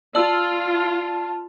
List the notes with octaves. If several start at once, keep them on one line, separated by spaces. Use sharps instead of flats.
F4 D5 A5 E6